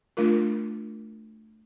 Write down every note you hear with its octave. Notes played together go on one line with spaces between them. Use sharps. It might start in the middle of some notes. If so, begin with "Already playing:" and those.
A3 D4 F4 A#4